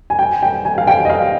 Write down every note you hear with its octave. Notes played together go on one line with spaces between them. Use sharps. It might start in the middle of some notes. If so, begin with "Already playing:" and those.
G#5
G5
G5
G#5
F5
G5
D#5
F5